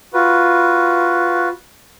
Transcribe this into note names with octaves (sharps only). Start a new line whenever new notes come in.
F4 F#4 B4